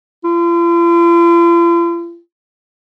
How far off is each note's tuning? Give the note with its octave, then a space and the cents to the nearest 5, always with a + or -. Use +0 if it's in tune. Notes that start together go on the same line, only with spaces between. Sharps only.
F4 -45